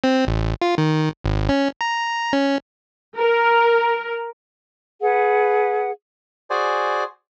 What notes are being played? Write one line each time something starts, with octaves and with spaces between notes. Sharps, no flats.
C4
A1
F4
D#3
G#1
C#4
A#5
C#4
A#4
G#4 B4 F#5
F#4 G#4 C5 D5 G#5